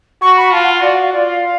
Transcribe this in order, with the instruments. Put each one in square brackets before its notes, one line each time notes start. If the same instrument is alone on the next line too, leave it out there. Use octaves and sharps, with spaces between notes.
[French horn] F#4 [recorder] C#6
[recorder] B5
[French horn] F4 [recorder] A5
[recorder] F#5
F5
[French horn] F#4 [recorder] D5
[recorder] F5
F5
[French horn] F4 [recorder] D5
[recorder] F5